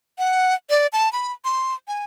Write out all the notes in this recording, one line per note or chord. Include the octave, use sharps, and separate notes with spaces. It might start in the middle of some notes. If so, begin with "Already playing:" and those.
F#5
D5
A5
B5
C6
G#5